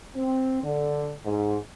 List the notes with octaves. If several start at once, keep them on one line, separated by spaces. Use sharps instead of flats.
C4
D3
G#2